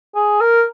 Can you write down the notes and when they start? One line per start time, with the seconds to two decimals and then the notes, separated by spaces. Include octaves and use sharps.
0.15 G#4
0.41 A#4